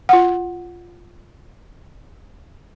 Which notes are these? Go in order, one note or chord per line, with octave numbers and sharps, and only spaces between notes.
F4 F#5